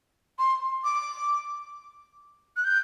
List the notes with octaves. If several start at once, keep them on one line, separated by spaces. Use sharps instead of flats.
C6
D6
F#6
G6